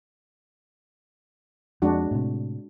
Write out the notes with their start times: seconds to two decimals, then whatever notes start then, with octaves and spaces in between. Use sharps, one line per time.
1.82 F2 G#3 D4 F#4
2.11 A2 C3